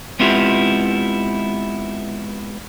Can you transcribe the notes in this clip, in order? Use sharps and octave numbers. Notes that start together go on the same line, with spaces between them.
G#3 B3 C4 E4 F4 G4